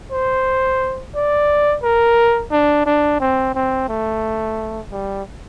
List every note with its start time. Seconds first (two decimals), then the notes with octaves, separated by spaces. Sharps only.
0.12 C5
1.15 D5
1.82 A#4
2.51 D4
2.86 D4
3.20 C4
3.55 C4
3.89 A3
4.91 G3